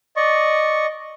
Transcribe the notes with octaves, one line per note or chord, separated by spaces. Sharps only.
D5 D#5 C#6